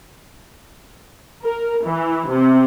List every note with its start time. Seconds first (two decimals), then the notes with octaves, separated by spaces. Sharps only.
1.43 A#4
1.85 E3
2.29 C3